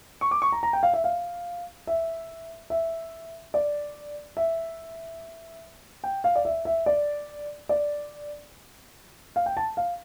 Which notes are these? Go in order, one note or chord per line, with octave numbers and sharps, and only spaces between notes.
C#6
D6
C#6
A#5
A#5
G5
F5
E5
F5
E5
E5
D5
E5
G5
F5
D5
E5
E5
D5
D5
F5
G5
A5
F5